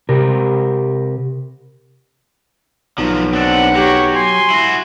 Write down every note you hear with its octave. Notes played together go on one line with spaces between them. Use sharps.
C3 G4 A#4
B1 F3 F#3
C4 D4 F#5
F#3 G4 C#5
G#5 C6
E4 F#4